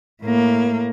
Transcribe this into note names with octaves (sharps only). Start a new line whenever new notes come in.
A2 A#3